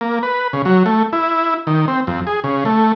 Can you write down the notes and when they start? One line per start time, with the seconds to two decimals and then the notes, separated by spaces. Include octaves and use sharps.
0.01 A#3
0.23 B4
0.53 C#3
0.65 F#3
0.86 A3
1.13 E4
1.67 D#3
1.88 C4
2.07 F2
2.27 G#4
2.44 C#3
2.65 A3